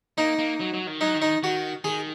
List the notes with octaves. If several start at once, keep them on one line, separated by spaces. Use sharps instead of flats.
A#3 D#4
A#3
F#3
F#3
D#3
F#3 D#4
D#3
D#4
D#3 F#4
D#3 G#4